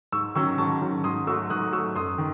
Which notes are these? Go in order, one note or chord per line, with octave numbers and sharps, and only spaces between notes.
G#2 C#6 E6
D#3 F#3 C#4 C#6 E6
G#2 A5 C#6
D#3 F#3 C#4
G#2 C6 D#6
F#3 A3 C#6 E6
G#2 D#6 F#6
F#3 A3 C#6 E6
F#2 C6 D#6
D#3